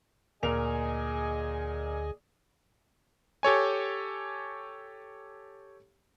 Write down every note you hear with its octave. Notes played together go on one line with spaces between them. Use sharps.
D2 A#2 G#4 A#4 D#5 G#5 F7
G4 A4 C#5 G#5